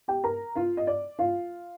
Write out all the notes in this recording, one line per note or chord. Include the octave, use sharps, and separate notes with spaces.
G4 G5
A#4 A#5
F4 F5
D#5
D5
F4 F5